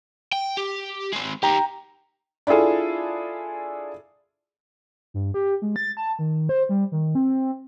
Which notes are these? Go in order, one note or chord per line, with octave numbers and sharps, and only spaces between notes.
G5
G4
G#3 C4
D#4 G4 G5 A#5
D4 E4 F4 G#4 A4
G2
G4
G#3
A6
A5
D#3
C5
G3
D#3
C4